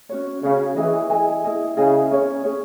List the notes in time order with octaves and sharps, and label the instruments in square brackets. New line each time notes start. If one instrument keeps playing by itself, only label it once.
[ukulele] C#4 F#4 C#5
[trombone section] C#3 [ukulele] C#4 F#4 C#5
[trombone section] E3 [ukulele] E4 G#4 D#5 G#5
[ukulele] E4 G#4 D#5 G#5
E4 G#4 D#5 G#5
[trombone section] C#3 [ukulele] E4 G#4 D#5 G#5
[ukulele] C#4 G#4 C#5
C#4 G#4 C#5